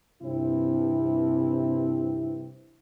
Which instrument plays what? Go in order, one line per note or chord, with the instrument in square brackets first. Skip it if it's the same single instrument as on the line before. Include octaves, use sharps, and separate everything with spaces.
[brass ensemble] G2 C3 E3 F3 C4 E4